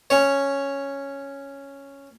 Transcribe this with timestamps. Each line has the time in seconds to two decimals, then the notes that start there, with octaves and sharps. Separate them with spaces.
0.10 C#4 C#5